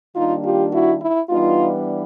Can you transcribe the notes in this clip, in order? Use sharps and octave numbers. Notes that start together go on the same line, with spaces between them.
D#3 G3 A#3 D4 D#4 F4
F4 G4
E4 F#4
E4
E3 G3 B3 D4 D#4 F4